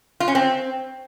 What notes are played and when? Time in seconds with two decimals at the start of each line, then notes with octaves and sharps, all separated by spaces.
0.20 F4
0.28 C#4
0.35 C4